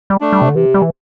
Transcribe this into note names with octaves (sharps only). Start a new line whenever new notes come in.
G3
A3 D4
G3
C3
D3
C3 E3
G3
E3